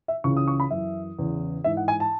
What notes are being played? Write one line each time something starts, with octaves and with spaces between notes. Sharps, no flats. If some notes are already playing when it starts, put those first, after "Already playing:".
E5
C#2 C#3 E3 C#6
D#6
C#6
B5
F#2 E3 E5
E2 C#3 E3
G#2 E3 E5
F#5
G#5
A5